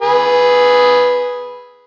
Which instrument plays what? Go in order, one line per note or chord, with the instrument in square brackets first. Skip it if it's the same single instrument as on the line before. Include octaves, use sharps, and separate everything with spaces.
[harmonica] G#4 B4